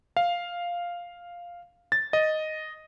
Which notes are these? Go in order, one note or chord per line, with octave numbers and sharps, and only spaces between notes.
F5
A6
D#5